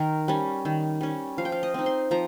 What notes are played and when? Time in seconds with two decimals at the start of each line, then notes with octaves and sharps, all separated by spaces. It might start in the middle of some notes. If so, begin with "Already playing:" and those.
Already playing: D#3 A#4
0.28 G3 C#4
0.65 D#3
1.01 G3 C#4
1.38 F3 F5
1.45 G5
1.52 F5
1.63 D#5
1.74 C4 D#4
1.86 C6
2.11 F3 A#5